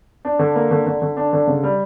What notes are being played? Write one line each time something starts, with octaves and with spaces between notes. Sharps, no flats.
D4
D3
A#3
D3
D3
D3
D4
D3
C#3
G3